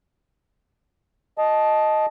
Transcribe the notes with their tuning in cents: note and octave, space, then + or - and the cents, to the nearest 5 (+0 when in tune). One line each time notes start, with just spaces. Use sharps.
D#5 +0 A5 -15